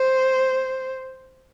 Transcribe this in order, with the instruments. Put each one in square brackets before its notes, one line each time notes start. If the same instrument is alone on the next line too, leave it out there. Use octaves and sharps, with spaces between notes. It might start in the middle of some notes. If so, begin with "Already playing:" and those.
Already playing: [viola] C5